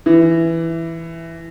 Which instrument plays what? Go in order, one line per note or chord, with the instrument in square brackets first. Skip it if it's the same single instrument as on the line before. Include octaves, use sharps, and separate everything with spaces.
[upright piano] E3